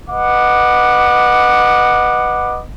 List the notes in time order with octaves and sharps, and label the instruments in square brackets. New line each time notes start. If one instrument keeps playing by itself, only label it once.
[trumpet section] B4 D#5 F#5 D6